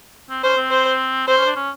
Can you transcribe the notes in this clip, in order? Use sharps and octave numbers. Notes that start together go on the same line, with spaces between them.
C4
C#4 C5
C4
C5
C4 C5
C#4
D4
C#4